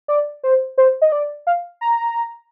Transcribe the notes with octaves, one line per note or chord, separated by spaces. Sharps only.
D5
C5
C5
D#5
D5
F5
A#5